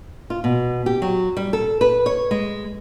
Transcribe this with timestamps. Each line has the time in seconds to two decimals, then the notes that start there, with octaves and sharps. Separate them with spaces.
0.30 F4
0.44 B2
0.86 G4
1.02 F#3
1.37 G3
1.53 A4
1.81 B4
2.06 C#5
2.31 G#3